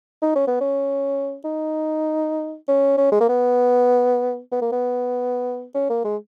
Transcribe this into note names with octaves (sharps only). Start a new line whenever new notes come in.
D#4
C#4
B3
C#4
D#4
C#4
C#4
G#3
A#3
B3
B3
A#3
B3
C#4
A#3
G#3